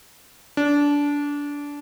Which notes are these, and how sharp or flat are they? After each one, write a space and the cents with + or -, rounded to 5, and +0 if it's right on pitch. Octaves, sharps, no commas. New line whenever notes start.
D4 -20